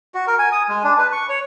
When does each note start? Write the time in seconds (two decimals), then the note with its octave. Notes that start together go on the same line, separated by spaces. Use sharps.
0.15 F#4
0.27 A#4
0.39 G#5
0.52 D#6
0.69 G#3
0.83 D4
0.98 B4
1.12 C#6
1.29 C#5